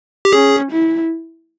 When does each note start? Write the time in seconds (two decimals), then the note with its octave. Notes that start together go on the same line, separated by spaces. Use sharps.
0.25 G4
0.33 C#4 G#4
0.72 E4